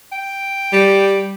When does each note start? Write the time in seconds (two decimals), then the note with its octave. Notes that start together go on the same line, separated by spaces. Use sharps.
0.12 G5
0.72 G3